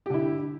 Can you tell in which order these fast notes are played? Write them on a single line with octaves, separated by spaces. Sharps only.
G4 D3 E4